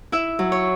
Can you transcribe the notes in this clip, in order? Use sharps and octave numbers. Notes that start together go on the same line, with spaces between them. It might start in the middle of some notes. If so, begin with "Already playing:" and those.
E4 E5
F#3
C#5